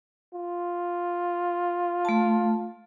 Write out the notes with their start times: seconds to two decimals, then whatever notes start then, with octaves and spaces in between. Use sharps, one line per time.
0.33 F4
2.05 A3 A5